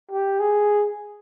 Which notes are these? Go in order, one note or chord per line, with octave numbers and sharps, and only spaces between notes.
G4
G#4